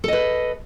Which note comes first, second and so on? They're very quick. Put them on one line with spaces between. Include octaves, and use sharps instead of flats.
A4 D#5 B4